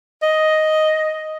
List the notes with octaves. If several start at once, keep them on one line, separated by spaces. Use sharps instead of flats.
D#5